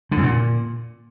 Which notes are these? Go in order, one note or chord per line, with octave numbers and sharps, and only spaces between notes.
D3
E2
A#2